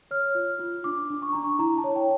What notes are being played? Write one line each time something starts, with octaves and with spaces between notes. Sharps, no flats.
C#5 F6
F4
F4
D4 D6
D4
C#6
D4 A#5
C#6
E4 A#5
A5
C#5
G5